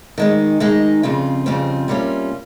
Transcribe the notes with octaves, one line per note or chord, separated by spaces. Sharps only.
D#3 G#3 D#4
D#3 G#3 D#4
F2 C#3 G3 C4 F4
F2 C#3 G3 C4 F4
C3 G3 A#3 C#4 F4